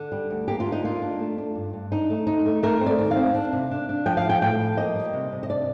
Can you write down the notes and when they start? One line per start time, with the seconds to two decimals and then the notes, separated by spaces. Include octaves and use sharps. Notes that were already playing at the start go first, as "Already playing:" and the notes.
Already playing: D3
0.12 G3
0.30 D2
0.48 A#3 G4
0.60 F4
0.66 D4
0.72 D#4
0.83 A#3 F4
1.02 D4
1.19 A3
1.38 D4
1.55 G2
1.73 G2
1.92 D4 D#4
2.10 A3
2.26 D2 D#4
2.46 A3
2.63 A3 A#4
2.80 C4
2.86 D5
2.99 D#2
3.11 F5
3.17 C4
3.35 D4
3.53 C3
3.71 D4
3.89 D4
4.06 F3 G5
4.17 F5
4.24 A2
4.29 G5
4.42 A2 G5
4.60 F3
4.77 A#3 D#5
4.96 G3
5.13 C3
5.32 C3
5.43 D#5
5.49 D4 D5